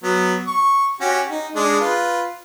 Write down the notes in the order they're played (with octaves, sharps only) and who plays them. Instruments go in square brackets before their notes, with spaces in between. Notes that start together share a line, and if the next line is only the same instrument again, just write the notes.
[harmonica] F#3 B3
C#6
C#4 F#4 G4
D#4
G#3 D4
F4 B4